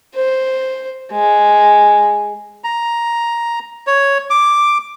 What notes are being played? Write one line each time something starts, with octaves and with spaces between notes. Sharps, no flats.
C5
G#3
A#5
C#5
D6